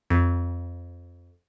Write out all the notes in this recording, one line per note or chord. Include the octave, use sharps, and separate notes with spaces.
F2